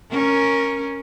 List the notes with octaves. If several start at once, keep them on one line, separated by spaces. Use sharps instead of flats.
C#4 A#4